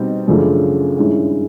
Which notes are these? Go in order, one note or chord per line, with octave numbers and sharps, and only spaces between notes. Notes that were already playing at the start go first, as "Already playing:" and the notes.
Already playing: B2 G3 C4 D#4
F#2 C#3 F3 A3 D4
G2 D#3 G#3 C#4 E4